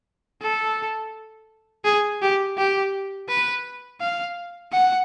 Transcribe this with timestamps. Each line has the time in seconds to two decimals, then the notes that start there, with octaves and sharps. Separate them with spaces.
0.42 A4
1.85 G#4
2.22 G4
2.58 G4
3.29 B4
4.01 F5
4.72 F#5